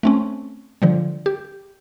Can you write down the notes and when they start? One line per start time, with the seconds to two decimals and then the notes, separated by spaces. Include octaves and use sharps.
0.03 A3 C4 C#4
0.82 D3 F3 G3
1.26 G4